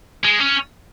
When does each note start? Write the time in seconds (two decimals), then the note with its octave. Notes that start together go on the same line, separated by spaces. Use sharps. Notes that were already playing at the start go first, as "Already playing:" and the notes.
0.25 G#3
0.40 C#4